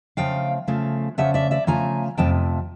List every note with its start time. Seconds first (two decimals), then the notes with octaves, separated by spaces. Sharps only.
0.17 C#3 F3 A3 F5 G5
0.67 C#3 F3 A3
1.18 C#3 F3 A3 E5 F#5
1.34 D5 E5
1.51 D5 E5
1.67 C#3 F3 A3 G#5 A#5
2.17 F2 C3 F3 A3 G5 A5